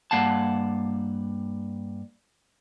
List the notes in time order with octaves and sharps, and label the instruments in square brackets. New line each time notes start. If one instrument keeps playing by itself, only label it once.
[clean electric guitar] G2 A#3 F5 F#5 A5